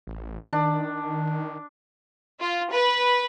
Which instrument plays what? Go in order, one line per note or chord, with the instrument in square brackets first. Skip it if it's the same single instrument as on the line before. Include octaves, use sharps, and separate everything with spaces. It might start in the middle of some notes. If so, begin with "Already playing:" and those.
[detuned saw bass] A1
[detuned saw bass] D#3 [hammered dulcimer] D4
[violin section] F4
B4